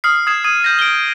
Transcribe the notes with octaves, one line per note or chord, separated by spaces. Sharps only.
D#6 F6 C7
D#6 G#6 C7 E7
D#6 G#6 D#7
G6 A#6
D7 G7